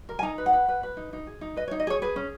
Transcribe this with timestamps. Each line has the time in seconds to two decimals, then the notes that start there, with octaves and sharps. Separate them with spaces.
0.09 A#4
0.19 G#5
0.23 D#4 A#5
0.38 B4
0.46 F#5
0.53 B4
0.68 B4
0.83 B4
0.97 D#4
1.13 D#4
1.27 G#4
1.41 D#4
1.56 B4 D#5
1.68 C#5
1.71 D#4
1.80 D#5
1.87 G#4 C#5
2.02 G#4 B4
2.16 C#4